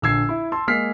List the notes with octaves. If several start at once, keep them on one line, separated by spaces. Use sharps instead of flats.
A#1 D3 E6 G#6 C7
E4
A5 C6 E6
G#3 A#3 F6 B6 C7